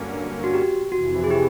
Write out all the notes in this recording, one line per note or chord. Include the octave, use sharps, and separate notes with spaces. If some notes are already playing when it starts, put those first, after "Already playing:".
Already playing: G2 D3 F#3 A#3 C#4
F#4
G4
F2 C3 E3 F#4
G#4
G4